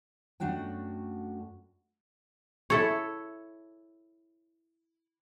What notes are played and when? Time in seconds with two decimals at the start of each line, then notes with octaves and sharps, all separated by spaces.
0.40 F#2 A3 D4 F#4 F#5 G5
2.70 E4 A4 C#5